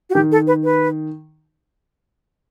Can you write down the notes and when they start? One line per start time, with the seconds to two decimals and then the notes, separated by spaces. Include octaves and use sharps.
0.10 F#4
0.14 D#3 G4
0.32 A4
0.47 B4
0.64 B4